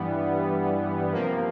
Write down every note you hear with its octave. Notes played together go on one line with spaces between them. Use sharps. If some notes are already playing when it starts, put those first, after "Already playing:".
Already playing: G2 E3 G3 B3
C3 F3 A#3